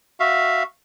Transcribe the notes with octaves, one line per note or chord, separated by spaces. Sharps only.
F#4 E5 F5